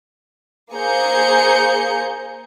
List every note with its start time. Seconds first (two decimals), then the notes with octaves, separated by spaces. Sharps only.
0.74 A#3 G#4 C5 A#5 G6 C#7